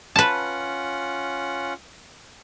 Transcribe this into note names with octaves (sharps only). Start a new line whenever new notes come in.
C#4 F4 B4 F#5 A5